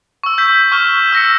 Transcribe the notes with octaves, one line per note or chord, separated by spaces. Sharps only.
C#6 E6
E6 G6 B6
C#6 F6 E7 G7
E6 A#6 C#7